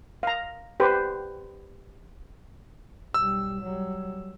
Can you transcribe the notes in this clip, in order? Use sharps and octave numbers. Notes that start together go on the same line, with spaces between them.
F5 A#5
G4 B4 C5
B1 G3 E6
F#3 G3